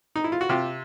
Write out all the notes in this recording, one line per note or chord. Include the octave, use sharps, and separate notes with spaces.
D#4
E4
F4
F#4
C3 F4 G4